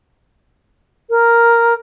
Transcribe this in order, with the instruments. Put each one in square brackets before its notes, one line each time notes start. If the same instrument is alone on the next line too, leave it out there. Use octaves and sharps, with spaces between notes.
[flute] A#4